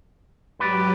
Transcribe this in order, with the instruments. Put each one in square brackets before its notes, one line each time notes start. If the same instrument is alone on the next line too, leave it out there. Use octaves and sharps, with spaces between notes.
[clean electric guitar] G#2 B4 D5 [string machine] F#3 G4